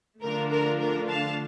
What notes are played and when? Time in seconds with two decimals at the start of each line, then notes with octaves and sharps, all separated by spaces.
0.21 D3 F3 A3 D4 F4 A#4
0.50 A#4
0.79 A#4
1.09 F5 A5